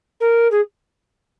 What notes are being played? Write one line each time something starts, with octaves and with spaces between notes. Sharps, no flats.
A#4
G#4